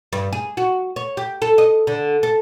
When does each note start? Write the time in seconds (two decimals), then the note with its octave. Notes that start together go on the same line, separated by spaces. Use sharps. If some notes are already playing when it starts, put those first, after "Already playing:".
0.13 G2
0.33 G#4
0.57 F#4
0.96 C#5
1.17 G4
1.42 A4
1.58 D#5
1.87 D3
2.23 A4